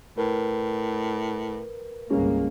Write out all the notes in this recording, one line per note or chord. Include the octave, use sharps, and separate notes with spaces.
A2 A#4 B4
G1 C2 G#3 A#3 C#4